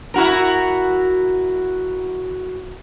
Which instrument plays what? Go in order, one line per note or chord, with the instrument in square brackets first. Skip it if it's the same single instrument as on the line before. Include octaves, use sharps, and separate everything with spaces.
[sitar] E4 F#4 A#4